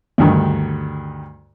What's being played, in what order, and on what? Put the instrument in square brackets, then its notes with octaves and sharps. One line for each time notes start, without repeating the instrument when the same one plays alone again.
[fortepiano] D2 G2 D#3